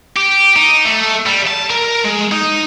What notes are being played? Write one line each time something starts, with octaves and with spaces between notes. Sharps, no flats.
G4
D#4
A3
G3
A5
A#4
G#3
D#4